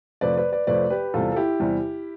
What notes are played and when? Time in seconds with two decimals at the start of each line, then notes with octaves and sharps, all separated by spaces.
0.21 F2 C3 F3 A3 B4 D5
0.37 B4 D5
0.52 B4 D5
0.67 F2 C3 F3 A3 B4 D5
0.90 G4 B4
1.14 E2 C3 G3 F4 A4
1.32 A4
1.36 E4 G4
1.60 E2 C3 G3